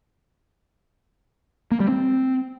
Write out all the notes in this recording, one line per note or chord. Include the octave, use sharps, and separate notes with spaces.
A#3
G3
C4